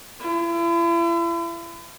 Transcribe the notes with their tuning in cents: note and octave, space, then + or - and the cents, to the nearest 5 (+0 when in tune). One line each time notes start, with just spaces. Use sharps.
E4 +40